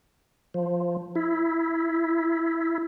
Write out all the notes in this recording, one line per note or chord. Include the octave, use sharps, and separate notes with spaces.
F3
E4